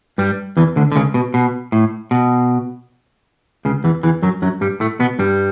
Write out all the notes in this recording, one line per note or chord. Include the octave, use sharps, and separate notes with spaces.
G2 G3
E2 E3
D2 D3
D3
C#2 C#3
B2
B2
A2
B2
C#2 C#3
E2 E3
E2 E3
F#2 F#3
F#2 F#3
G2 G3
A2 A3
B2 B3
G2 G3